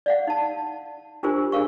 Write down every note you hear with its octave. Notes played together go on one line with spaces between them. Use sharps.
D5 F5 F#5
D#4 A5
D4 F4 G4 A#4 C5 G#5
D4 G#4 A#4 F5 C#6